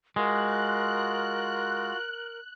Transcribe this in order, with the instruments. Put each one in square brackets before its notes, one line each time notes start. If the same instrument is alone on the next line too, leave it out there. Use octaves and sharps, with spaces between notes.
[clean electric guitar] G#3 [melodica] F4 F#4 [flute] A#4 [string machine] F#6